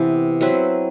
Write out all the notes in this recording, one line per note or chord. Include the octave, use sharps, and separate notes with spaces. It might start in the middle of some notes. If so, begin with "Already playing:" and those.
Already playing: C3 E3 B3
F#3 C4 E4 B4